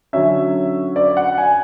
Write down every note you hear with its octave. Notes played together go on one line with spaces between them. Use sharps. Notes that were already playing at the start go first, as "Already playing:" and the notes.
D3 F#3 C#4 E5
D5
F#5
G#5